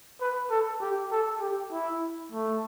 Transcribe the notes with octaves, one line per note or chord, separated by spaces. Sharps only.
B4
A4
G4
A4
G4
E4
A3